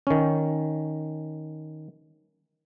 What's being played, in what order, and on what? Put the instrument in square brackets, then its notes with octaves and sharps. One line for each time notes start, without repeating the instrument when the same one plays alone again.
[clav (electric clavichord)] D#3 C#4